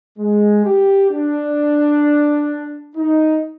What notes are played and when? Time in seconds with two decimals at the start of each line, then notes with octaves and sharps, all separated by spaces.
0.19 G#3
0.65 G4
1.11 D4
2.96 D#4